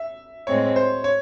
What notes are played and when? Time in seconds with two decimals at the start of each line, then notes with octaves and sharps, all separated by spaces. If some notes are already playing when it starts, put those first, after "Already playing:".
Already playing: E5
0.47 A2 G#3 C4 C#5
0.76 C5
1.04 C#5